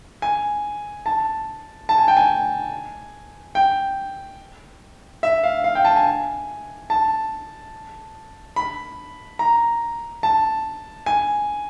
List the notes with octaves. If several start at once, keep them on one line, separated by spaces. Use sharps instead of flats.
G#5
A5
A5
G#5
G5
G#5
G5
E5
F5
F5
G5
A5
G#5
A5
B5
A#5
A5
G#5